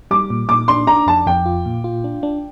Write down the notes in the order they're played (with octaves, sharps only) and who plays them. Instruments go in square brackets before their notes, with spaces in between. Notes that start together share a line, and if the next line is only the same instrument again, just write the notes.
[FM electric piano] G3 [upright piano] D6
[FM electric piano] A#2
[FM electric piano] A#2 [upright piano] D6
[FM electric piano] D4 [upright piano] C6
[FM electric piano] D4 [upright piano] A#5
[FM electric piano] F2 [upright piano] A5
[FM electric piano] F2 [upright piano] G5
[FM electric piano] F4
A#2
F4
D4
D4